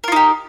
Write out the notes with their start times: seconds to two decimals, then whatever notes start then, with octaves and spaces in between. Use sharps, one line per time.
0.04 A#4
0.08 F4
0.12 D#4
0.16 G4